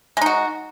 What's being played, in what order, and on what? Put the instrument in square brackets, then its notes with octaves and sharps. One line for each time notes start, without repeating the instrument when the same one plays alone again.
[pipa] G#3
D#4
F#4